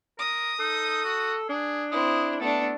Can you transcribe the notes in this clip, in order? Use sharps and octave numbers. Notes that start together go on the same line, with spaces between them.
A#4 D#6
D#4 A4
F#4
D4 G#4
C4 E4 D#6
A3 B3 D4 A4